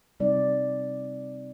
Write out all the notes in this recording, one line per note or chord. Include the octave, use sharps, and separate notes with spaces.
C3 G3 C4 D#4 D5